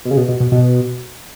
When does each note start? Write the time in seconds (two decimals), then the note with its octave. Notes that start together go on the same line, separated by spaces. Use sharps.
0.05 B2
0.11 C#3
0.17 B2
0.28 B2
0.40 B2
0.52 B2